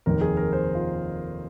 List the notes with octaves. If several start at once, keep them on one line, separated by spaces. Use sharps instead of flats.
F1 D#2 D#3 A#4
G#4
A#4
C5
F4